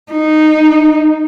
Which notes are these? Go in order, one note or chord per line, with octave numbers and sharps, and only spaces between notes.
D#4